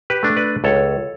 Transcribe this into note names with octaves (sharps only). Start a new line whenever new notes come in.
G4 B4
A3 D4
B4 D5
C#2 A4 C#5